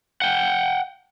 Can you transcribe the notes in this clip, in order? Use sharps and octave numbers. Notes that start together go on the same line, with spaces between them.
F#5 G5